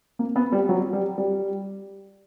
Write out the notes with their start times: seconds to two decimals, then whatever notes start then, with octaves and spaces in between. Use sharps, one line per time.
0.19 A#3
0.36 B3
0.52 G3
0.69 F#3
0.93 G3
1.18 G3